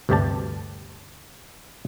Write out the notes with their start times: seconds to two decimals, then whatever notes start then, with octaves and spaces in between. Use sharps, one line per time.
0.09 D2 G2 C3 G4 D5 A5